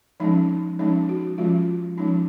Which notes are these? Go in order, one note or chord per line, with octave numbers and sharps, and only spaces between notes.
F3 G#3 C#4 D#4
F3 G#3 C#4 D#4
F#4
F3 G#3 C#4 F4
F3 G#3 C#4 D#4